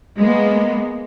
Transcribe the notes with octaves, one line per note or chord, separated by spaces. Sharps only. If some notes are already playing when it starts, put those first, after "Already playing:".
G#3 A#3 B3